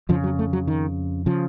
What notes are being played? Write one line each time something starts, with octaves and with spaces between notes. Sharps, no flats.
F2 C#3 F3
F#3
A3
F#3
D#3
C#3 F3